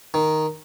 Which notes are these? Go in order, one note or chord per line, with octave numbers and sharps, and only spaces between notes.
D#3